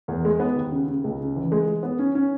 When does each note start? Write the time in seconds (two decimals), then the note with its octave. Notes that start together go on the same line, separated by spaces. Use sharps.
0.08 E2
0.25 G#3
0.40 B3
0.56 D#2
0.72 C#3
0.88 C#3
1.04 C#2
1.20 C#3
1.36 E3
1.52 G#3
1.67 G#3
1.83 B3
1.99 C#4
2.15 C#4